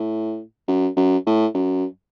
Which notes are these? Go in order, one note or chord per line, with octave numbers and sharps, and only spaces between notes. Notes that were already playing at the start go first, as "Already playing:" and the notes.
Already playing: A2
F#2
F#2
A2
F#2